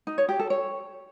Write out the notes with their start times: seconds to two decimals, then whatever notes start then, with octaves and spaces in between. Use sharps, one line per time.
0.07 D#4
0.18 C#5
0.29 G4
0.39 A4
0.50 C#5